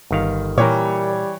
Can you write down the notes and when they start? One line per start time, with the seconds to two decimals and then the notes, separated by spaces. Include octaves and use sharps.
0.11 G1 D#3 F5
0.58 A#2 E3 G3 G4 A#4 C#5 D5